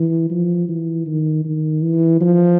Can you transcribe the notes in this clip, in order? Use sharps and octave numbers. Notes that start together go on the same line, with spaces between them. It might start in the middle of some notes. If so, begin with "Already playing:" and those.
Already playing: E3
F3
E3
D#3
D#3
E3
F3